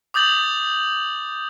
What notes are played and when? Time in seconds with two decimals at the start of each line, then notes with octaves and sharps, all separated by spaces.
0.14 D6 D#6 G6 A6 F#7